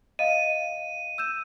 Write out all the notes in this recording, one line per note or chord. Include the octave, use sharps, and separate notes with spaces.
D#5 F5 D#7
E6 G6 E7